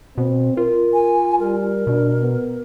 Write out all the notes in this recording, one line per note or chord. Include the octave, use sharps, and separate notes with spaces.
B2 C4
F4 A#4
G#5
G3 A#4
B2 D4
B3